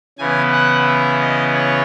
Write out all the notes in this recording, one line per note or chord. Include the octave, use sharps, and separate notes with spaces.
C#3 E3 B3 G#5
F#5
E5
D#5
C#5